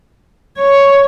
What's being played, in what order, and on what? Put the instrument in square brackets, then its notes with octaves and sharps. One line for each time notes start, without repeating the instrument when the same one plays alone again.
[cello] C#5